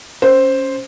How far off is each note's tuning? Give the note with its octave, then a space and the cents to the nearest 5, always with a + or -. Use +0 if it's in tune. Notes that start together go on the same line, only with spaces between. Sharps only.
C#4 +0 C5 +5